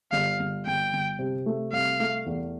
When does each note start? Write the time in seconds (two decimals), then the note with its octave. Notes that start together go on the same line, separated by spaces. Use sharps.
0.12 G1 F5
0.39 G1
0.66 G1 G5
0.93 G1
1.19 C3
1.46 A3
1.73 C2 F5
2.00 A3
2.26 E2